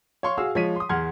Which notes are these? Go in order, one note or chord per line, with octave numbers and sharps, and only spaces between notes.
C#5 F5 C6 C#6
F#4 G#4 F5 E6
F3 G#3 C#5 B6 D#7
C6 D#6
E2 F#5 C6 F6 G#6